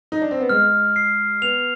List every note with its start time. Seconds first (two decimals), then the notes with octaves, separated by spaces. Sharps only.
0.12 D#4
0.22 D4
0.31 C4
0.40 B3
0.49 G#3 F6
0.96 C7
1.42 B3 F7